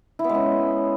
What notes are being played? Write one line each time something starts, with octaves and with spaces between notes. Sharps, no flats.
E4
B3
G#3
C#4